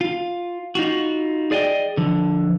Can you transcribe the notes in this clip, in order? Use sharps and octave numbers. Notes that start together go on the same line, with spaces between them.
F4
D#4 F4 F#4
G#4 D5 D#5 F5 G5
D3 F3